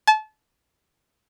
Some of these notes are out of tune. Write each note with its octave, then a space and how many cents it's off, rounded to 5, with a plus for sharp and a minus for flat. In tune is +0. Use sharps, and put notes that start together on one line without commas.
A5 -30